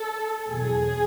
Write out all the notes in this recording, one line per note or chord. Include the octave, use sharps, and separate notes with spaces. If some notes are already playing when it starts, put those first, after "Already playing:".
Already playing: A4
E2 B2 F#3 G#4